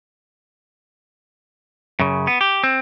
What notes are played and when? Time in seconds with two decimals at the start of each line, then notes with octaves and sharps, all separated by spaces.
2.00 F#2 C#3
2.27 B3
2.41 G4
2.64 C4